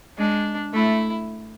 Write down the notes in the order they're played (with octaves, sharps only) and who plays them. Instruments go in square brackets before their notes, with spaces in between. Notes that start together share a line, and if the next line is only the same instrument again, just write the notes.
[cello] G#3 [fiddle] D4
[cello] A3 [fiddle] E4